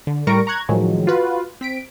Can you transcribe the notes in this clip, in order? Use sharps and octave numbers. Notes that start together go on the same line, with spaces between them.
D3
A2 G3 A#4 C#6 A#6 D7
A#5 C#6 F#6 G#6
A2 D#3 F3 F#3 G#3
F4 F#4 B4
C4 B6 D7